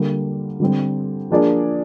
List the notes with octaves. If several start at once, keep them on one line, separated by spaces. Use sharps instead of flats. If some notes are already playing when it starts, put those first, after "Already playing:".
Already playing: D3 G3 A#3
D3 G3 C4
F3 A#3 D4 G#4 D5